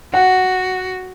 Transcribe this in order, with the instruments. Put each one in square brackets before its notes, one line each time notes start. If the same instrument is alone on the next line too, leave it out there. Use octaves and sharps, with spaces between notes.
[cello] F#4 [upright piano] F#5